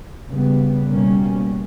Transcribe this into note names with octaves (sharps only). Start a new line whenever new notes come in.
C#3 G3 B3
B2 G3 A#3 C#4